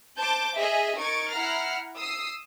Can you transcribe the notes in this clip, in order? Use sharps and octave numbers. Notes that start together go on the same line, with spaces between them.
C5 A5 D6 G6
G#4 D#5 E5
D#4 A#4 C#6 G#6 A6 D7
E4 F#5 A#5 F6 C7
D#6 E6 C7